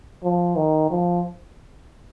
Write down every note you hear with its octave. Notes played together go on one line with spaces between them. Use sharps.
F3
D#3
F3